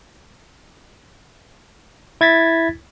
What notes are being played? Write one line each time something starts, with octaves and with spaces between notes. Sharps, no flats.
E4 G#6 A6 B6